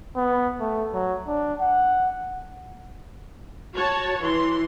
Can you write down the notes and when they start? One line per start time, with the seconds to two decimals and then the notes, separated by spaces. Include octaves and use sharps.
0.16 B3
0.60 A3
0.93 F#3
1.27 D4
1.60 F#5
3.74 F#4 C#5 A5
4.20 E3 C6